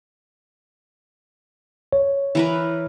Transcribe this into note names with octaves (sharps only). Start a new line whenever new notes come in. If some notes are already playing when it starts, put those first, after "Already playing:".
C#5
E3 A#4 B4